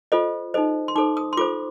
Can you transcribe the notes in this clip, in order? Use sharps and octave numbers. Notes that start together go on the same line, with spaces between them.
F4 A4 C5 D#5
D#4 A4 C5 D#5
C6
D#4 A4 C5 D6
D#6
C6
F4 A4 C5 D6